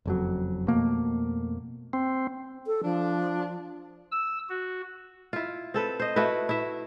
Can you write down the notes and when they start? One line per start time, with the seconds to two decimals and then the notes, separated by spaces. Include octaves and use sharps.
0.06 F#1 F2 F#3
0.68 F2 B2 A3 A#3
1.93 C4
2.67 A4
2.84 F3 D4
4.11 E6
4.49 F#4
5.33 E4 F4
5.74 C4 A4 B4
6.00 C5 D#5
6.16 A3 E4 F#4 B4
6.49 E4 E5